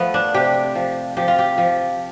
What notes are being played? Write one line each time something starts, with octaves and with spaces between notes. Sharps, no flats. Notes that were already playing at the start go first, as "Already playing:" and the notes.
Already playing: F3 A3 B3
D4
C3 G4
F3
F3 G4
F4
G4
F3